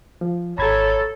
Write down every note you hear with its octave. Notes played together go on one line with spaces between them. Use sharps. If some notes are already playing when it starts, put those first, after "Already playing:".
F3
G#1 A4 C#5 A#5 B5 G#6 A6